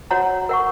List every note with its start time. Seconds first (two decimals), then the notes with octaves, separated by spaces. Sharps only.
0.11 F#4 C#5 F#5 A#5
0.49 A#4 F#5 C#6